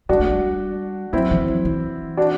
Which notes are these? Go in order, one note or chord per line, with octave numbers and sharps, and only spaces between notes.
G3 D4 F#4
A3
G3
F#3 C4 E4
E3
F#3
E3
D4 F#4